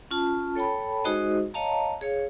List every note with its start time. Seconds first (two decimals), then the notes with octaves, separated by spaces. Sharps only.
0.11 C#4 F4 A5
0.55 A4 C#5 G5 A5 B5
1.04 G#3 D#4 F#4 G#4 C5 D#5
1.54 C#5 D#5 F5 A5 A#5
2.01 G#4 C#5 F5